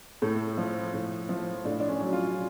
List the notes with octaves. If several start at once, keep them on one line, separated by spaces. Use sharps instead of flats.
A2 A4
F3
A2
F3
A2 D4
D4
C#4
F#3
F4